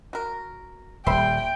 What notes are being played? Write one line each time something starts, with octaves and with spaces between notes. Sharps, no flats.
F#4 A#4
D#1 G3 E5 G5 B5 C6